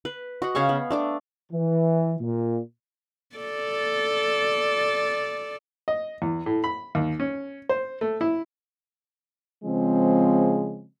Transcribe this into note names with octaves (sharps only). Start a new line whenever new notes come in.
B4
F#4 D#5 F#5
C#3 F5 G#5 C#6
B3
A3 D4 D6
E3
A#2
A4 D5
D#5
E2
A2
B5
D#2
C#4
C5
A3
E4
C#3 F3 G#3 C4